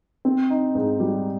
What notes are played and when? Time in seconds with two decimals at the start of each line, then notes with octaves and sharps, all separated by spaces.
0.25 C4
0.50 D#4
0.75 G#2
1.00 G3